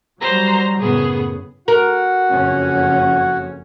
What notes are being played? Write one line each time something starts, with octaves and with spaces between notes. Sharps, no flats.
F#3 G3 C5 A#5
F#2 A2 C#3 B3 G#4
F#4 A#4 F#5
F#1 F2 C#4